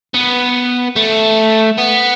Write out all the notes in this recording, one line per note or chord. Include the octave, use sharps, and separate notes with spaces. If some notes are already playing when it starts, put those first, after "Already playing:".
B3
A3
B3